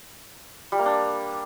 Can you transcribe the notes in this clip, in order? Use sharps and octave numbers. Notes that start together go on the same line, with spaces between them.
G3
A#3
D4